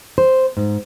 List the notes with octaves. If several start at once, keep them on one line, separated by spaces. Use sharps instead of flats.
C5
G#2